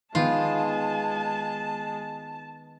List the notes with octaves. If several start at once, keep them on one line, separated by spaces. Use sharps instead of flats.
D#3 G#3 B3 F4 A5